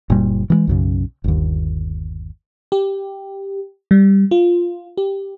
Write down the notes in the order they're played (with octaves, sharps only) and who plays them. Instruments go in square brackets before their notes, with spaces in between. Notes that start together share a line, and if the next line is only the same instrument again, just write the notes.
[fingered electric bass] F#1 A#2 G3
E3 F#3 G#3
B1 F#2 C#3
G1 D#2
[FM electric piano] G4
G3
F4
G4